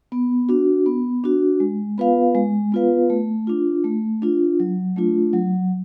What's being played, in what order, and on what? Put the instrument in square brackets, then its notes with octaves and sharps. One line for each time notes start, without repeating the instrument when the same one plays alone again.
[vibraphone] B3
D4 F#4
B3
D4 F#4
G#3
B3 F4 B4 F5
G#3
B3 F4 B4 F5
A3
D4 F4
A3
D4 F4
F#3
A3 D4 F4
F#3